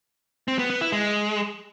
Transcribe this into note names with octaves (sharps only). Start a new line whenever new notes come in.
C4
B3
B3
E4
G#3